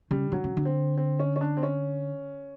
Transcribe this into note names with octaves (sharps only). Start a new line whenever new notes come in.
C#3 G3
D3 F#3
C#3
D3
C4
C4
C#4
C#4
D4
C4
C#4